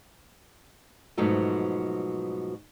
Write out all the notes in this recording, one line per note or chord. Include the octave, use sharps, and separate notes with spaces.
G#2 B2 F3 F#3 A3